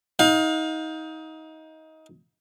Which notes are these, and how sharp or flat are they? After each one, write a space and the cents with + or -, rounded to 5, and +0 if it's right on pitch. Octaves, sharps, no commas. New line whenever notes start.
D#4 +25 F5 +35